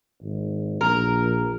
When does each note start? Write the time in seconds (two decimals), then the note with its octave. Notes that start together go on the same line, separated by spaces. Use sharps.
0.22 G#1
0.81 A#1 A#4